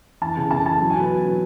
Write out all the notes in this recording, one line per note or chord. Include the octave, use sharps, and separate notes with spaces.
E3 A5
C#3
C#3 A5
E3 A5
F#3
G#5
B2 B4
B2
F#3